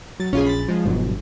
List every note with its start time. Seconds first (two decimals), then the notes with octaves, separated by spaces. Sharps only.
0.20 F#3 A6
0.33 A#1 C#4 F4 G#4
0.47 B5 A6
0.68 F3 G#3
0.85 G1 G#2 B2 F#3